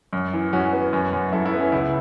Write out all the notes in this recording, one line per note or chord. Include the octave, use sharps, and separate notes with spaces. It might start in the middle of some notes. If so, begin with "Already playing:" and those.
F#2
E3
F#2 C#4 F#4
B3
F#2
F#2
F#2 E4 A4
E4
B3
C#4
C#2 E4